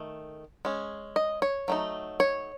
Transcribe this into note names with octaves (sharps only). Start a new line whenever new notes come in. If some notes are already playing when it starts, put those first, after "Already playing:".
Already playing: D#3 A3
G#3 C#4
D#5
C#5
F#3 A3 D#4
C#5